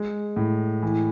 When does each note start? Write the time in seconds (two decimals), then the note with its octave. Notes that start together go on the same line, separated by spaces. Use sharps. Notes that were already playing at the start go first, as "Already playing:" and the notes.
Already playing: G#3
0.36 A2
0.82 E3